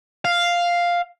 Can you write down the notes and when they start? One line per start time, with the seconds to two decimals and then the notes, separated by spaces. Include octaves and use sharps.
0.25 F5